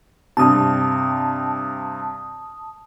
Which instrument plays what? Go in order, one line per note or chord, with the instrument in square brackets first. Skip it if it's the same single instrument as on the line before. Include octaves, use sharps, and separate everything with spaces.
[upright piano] G2 C3 [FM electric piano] A5 D#6